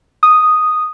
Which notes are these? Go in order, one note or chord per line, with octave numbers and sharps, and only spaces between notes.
D#6